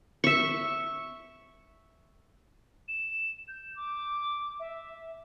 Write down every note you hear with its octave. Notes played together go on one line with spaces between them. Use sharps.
E5 C#6
E7
G6
D6
E5